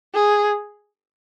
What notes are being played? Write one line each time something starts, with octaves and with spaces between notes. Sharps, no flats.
G#4